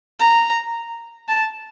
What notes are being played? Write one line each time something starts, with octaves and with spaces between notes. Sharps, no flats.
A#5
A5